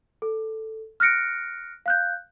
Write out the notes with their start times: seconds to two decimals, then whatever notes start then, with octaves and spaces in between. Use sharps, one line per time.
0.22 A4
1.00 F6 F#6 A#6 C#7 D7
1.86 F5 F#6 G6